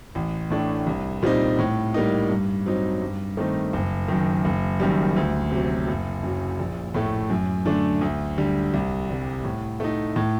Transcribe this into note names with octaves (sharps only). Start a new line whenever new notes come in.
A1
A2 A3 D4
C2
A#2 G3 C4 D#4
A2
G3 A#3 D#4
G2
F#3 C4 D#4
G2
D#3 A3 C4 D#4
F#1
F#2 D#3
F#1
F#2 D#3 G3
D2
C3 F#3
F#1
F#2 F#3
A#1
A2 A3
F#2
D3 A3 D4
D2
D3 G3
C2
C3 G3
A2
A3 D#4
A2